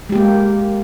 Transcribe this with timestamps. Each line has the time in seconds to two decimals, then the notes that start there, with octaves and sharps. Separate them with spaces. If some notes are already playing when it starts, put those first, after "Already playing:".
0.09 G#3
0.12 G4
0.15 A#3